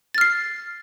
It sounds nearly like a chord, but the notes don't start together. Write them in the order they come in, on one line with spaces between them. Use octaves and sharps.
A6 F6 C7